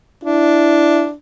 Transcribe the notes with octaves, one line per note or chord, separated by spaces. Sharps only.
D4 E4